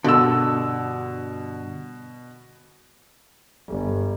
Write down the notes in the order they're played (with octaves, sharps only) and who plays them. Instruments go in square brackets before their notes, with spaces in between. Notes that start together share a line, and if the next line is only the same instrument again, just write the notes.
[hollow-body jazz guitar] G2 D3 [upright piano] B2 E6
[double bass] G1